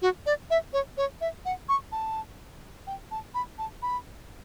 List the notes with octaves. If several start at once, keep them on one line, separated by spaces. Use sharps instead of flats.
F#4
D5
E5
C#5
C#5
E5
F#5
C#6
A5
G5
A5
B5
A5
B5